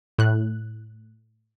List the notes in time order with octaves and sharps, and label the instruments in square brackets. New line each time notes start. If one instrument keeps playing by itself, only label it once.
[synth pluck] A2 F#6